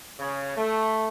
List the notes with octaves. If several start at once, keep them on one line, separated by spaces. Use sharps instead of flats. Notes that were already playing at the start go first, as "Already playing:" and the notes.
C#3
A3